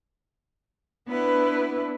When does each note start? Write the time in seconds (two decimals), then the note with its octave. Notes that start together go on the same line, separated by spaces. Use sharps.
1.08 B3 D4 E4 B4